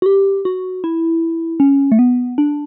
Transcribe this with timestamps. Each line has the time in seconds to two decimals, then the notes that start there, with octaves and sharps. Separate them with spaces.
0.02 F#4
0.06 G4
0.45 F#4
0.84 E4
1.60 C#4
1.92 A3
1.99 B3
2.38 D4